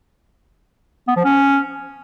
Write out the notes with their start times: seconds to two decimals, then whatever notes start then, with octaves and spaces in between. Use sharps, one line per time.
1.08 B3
1.16 F3
1.24 C#4